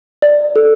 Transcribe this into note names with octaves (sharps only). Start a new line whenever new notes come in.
D5
A4